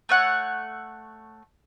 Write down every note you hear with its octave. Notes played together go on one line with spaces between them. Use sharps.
A3 C#5 F#5